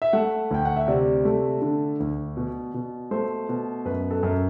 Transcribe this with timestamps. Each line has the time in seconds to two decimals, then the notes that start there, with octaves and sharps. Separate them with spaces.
0.02 E5
0.13 A3 F#5
0.51 D2 G5
0.65 F#5
0.77 E5
0.88 C3 D5
1.25 A3
1.62 D3
2.00 D2
2.37 B2
2.74 B2
3.11 A3 C5
3.49 B2
3.85 F#2 B4
4.11 A4
4.23 F#2